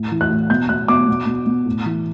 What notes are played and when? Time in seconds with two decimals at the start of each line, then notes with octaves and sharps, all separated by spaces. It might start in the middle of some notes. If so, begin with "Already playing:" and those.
Already playing: A2
0.12 E3
0.21 F#6
0.30 A2
0.50 B2 G6
0.69 B2 F#6
0.88 B2 D6
1.09 B2
1.27 B2
1.46 B2
1.66 A2
1.86 E3